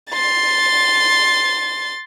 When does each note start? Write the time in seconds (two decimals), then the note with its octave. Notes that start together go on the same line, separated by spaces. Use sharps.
0.11 C6 A6